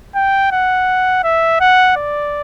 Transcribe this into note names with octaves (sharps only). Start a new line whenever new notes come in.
G5
F#5
E5
F#5
D5